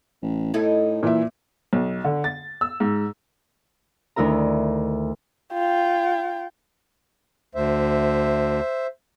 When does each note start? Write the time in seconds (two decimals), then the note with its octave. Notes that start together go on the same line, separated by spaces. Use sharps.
0.22 A1
0.54 A2 D#4 E4 A4
1.03 A#2 E3 E5
1.73 B1
2.05 D3
2.24 A6
2.61 E6
2.80 G#2
4.16 D2 D#3 E4 A#4 A#5
5.53 F4 G5
7.55 D2 C5 E5